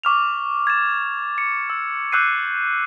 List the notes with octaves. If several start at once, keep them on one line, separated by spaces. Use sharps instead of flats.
C#6 D6 F6 F7
G#6 A6 E7
C#7
E6
D6 E6 F#6 G6 C7 D#7